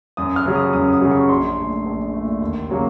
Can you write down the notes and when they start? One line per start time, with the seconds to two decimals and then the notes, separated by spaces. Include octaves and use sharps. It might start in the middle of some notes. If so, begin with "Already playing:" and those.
0.17 F#2 D#6
0.36 F6
0.46 C#3 F#3
0.55 D#6
0.73 F#2 D#6
0.93 D#6
1.02 C#3 F#3
1.11 C#6
1.29 A#1 C6
1.57 A#2 A3
1.86 A#1
2.14 A#2 A3
2.41 D#2
2.69 C#3 F#3 A#3